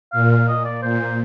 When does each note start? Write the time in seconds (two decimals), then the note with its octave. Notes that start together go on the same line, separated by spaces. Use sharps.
0.13 A#2 F5
0.31 F5
0.48 D#5
0.65 D5
0.83 A#2 C5